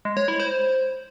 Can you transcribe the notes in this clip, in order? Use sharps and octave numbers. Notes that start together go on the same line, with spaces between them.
G#3
C#5
E4
C5